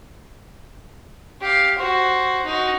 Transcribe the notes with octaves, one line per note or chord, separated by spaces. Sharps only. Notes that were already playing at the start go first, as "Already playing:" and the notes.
G4 F5
F#4 C5
D#4 F#4